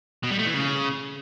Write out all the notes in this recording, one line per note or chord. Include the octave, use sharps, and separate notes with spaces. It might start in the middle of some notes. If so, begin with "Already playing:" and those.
B2
G3
A3
E3
C#3